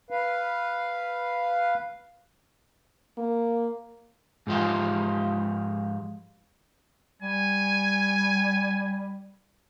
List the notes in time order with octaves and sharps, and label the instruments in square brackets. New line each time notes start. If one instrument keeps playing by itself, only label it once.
[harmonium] B4 F5
[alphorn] A#3
[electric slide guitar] G#2 F3 G#3 F4 G4
[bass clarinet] G3 [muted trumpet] G#5